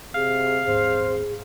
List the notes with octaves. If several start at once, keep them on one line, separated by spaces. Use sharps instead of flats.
C3 G#4 F5
D#1 G#2 C4 C5